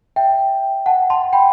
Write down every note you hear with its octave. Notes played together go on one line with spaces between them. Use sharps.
E5 G5
F#5 A5
A5 C6
G5 B5